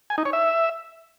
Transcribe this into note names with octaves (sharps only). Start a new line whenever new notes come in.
G#5
D#4
C#5
E5